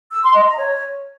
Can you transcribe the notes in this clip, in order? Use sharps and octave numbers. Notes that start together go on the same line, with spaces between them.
E6
C6
D#5
A#5
C#5